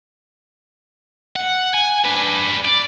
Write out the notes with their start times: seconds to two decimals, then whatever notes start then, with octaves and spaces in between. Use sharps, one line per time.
1.36 F#5
1.74 G#5
2.05 D4 B4
2.65 D5